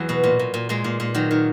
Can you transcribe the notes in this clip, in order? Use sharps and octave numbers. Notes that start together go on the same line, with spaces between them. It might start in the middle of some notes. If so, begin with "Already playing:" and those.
Already playing: E2 F#3
B2
A#2
A#2
A#2
A#2 G#3
A#2
A#2
D#3 F#3
D#3